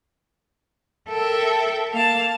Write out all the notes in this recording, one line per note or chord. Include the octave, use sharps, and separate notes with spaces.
A4 A#4 E5 G5
A#3 F5 A5